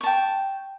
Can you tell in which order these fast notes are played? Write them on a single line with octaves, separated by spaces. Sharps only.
C#6 A5 G5